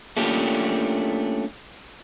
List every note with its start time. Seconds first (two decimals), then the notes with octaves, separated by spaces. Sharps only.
0.17 A3 A#3 C#4 D4 F4 G4